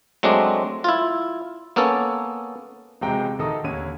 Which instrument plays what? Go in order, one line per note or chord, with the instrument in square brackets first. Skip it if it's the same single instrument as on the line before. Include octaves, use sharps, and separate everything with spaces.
[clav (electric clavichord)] F#3 G#3 A3 C4 D4
E4 F4
A#3 B3 C#4 A4
[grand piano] E1 C3 G#3 G5 A#5
D2 D#3 A4 D#5 A#5 D#6
D#2 D3 C#5 D#7